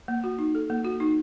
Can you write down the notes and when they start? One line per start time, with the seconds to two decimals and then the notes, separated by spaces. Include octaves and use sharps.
0.08 A#3
0.24 F#4
0.39 D#4
0.55 A4
0.70 A#3
0.85 F#4
1.00 D#4